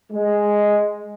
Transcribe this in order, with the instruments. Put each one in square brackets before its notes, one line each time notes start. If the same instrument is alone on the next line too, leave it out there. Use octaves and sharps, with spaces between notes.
[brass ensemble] G#3